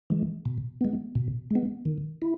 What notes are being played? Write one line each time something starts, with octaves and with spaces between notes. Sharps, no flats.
E3 G#3
B2
G#3 B3
B2
G#3 B3
D#3
E4